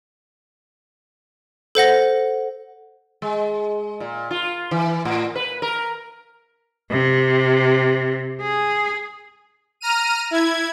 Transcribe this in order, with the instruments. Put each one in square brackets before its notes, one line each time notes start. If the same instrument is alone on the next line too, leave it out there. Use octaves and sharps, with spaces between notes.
[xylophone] A4 C5 F#5 A#6
[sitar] G#3
A#2
F4
E3
A2
B4
A#4
[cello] C3
G#4
[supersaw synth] A#5 F6 D#7
E4 G#6